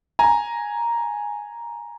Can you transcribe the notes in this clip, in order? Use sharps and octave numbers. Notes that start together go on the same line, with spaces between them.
G#5 A#5